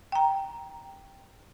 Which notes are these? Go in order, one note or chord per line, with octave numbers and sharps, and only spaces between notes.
G5 A#5